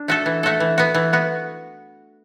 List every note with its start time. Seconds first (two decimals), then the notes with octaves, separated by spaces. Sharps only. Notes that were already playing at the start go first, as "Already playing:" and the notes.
Already playing: D4
0.08 A3 F#4 A4
0.26 E3
0.43 A3 F#4 A4
0.60 E3
0.78 B3 F#4
0.95 E3
1.13 B3 F#4